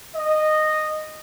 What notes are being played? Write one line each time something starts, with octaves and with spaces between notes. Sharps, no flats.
D#5